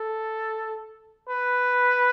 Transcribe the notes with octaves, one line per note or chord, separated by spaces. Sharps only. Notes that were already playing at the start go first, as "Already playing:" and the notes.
Already playing: A4
B4